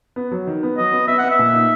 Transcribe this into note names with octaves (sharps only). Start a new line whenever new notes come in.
B3
F#3
D#3
B3
F#3 D#5
B3
B3 E5
B3 F#5
E5
A#2
D#4